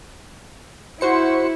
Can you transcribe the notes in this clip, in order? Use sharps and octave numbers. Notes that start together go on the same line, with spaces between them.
E4 F#4 C5 C#7